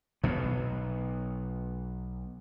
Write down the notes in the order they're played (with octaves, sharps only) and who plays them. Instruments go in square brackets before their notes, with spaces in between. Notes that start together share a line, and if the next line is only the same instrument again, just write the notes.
[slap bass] B1 B2 B3